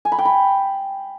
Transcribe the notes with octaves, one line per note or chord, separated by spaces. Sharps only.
G#5
B5
G5
B5